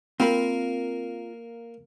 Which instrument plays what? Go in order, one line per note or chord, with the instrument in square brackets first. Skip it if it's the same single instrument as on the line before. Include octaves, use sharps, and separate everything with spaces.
[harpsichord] A#3 [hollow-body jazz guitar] C4 F4 B5